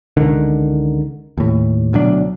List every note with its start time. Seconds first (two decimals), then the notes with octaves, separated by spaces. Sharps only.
0.17 C#2 D3 D#3
1.38 D#2 A2
1.94 D2 B2 F#3 D4